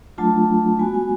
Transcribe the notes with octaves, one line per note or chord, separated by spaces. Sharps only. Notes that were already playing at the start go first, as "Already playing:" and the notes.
F#3 A3 D4 F4 A5
G#3 B3 F#4 G#5
G#5